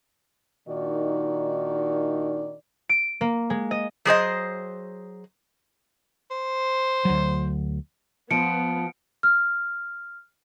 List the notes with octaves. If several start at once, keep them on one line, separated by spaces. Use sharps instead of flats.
A#2 D#3 D4 D#4 F#4 D5
D7
A#3
G#3
D#5
F#3 G#4 C5 D#5
C5
D2 F#3
F3 B3 C#7 D7
F6